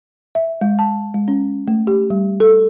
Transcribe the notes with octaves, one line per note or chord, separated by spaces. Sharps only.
E5
G#3
A5
G#3
C#4
A3
G4
G3
A4